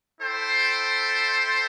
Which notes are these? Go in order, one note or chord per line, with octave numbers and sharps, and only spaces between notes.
E4 A4 C5 G5